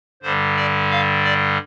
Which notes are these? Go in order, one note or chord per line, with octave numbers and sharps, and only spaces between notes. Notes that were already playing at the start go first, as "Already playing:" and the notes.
G2 D3 G3 C5
D5
F5
D5